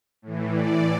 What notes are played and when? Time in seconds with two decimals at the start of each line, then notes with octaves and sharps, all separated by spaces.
0.22 A2 E3
0.53 D5